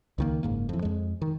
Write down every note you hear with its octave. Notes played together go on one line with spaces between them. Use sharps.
C#2 D#3 A#3
F#1 G#2 A#3
F2 E3
F2 G#3
D#3